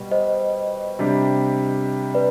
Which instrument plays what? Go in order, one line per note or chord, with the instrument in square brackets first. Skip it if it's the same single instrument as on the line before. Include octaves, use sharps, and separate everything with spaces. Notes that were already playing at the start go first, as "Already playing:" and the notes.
Already playing: [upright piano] B2 G3 B3
[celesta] C5 D#5
[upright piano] C3 G3 D4 G4
[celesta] B4 D5